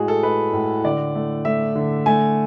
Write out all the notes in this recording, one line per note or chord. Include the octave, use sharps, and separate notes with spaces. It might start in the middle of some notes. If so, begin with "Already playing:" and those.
Already playing: A2 G#3 F#4 G#4
A4
G#3 B4
A2
D3 D5
A3
A3 E5
D3
A3 G#5